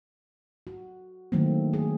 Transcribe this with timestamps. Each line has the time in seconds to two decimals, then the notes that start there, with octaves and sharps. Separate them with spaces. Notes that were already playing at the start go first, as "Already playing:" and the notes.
0.67 F#4
1.32 D3 D#3 F#3 A3 A#3 C4
1.73 G#4